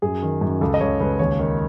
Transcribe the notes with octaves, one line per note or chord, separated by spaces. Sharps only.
F#2 G#4
D#3
F#2
C#2 A4
D#5
C#2 C#5
C#2 B4
D#2 C#5
D#3